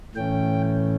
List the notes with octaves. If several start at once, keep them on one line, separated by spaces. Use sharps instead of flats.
A2 E3 A3 C#4 G5